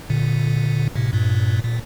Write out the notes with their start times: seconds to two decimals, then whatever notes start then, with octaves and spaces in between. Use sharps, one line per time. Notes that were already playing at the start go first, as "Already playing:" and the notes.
0.10 A#2 D3
0.96 A2 C3
1.13 G2 A#2
1.64 A#2